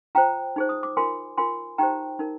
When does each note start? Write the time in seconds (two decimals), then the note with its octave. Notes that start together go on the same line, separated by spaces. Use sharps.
0.15 F4 C5 G5 A#5
0.56 D#4 G#4 C5
0.69 D#6
0.83 D6
0.97 F4 A#4 G#5 C6
1.38 F4 A#4 G#5 C6
1.78 D#4 G4 C5 G5 A#5
2.19 D#4 A#4